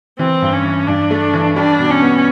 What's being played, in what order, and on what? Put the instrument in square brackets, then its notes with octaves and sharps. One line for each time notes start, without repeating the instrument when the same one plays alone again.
[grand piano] E3 [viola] C4
[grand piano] G2
[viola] C#4
[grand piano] E3
[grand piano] G2 [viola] D4
[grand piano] A3
E3
[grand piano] G3 [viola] D4
[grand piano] B2
[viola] C#4
[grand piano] B3